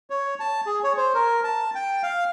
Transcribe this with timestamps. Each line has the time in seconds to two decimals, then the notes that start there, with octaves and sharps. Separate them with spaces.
0.10 C#5
0.40 A5
0.66 G#4
0.84 C#5
0.97 C5
1.15 A#4
1.44 A5
1.75 G5
2.03 F5